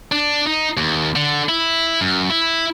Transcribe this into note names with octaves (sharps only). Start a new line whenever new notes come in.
D4
D#4
D#2
D3
E4
F#2
E4